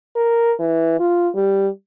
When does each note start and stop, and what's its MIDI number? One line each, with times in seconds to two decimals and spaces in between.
0.16 0.53 70
0.60 0.99 52
1.00 1.29 65
1.35 1.68 55